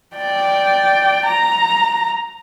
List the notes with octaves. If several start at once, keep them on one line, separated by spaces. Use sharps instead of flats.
D5 G5
A#5